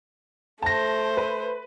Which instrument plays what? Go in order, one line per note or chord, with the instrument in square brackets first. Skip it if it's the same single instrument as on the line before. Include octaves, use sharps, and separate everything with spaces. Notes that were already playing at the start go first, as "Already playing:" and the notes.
[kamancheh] A3 C5 [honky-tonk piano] A5 A#6
[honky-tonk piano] B4